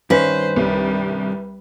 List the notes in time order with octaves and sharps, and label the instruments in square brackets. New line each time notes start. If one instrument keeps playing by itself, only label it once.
[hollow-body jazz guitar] G2 D#3 C#4 [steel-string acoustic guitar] B4 [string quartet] C5
[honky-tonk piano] C2 [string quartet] G3